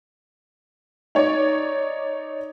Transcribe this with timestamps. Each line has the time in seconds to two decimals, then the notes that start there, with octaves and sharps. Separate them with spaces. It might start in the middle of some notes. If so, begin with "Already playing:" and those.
1.15 D#4 C#5 D5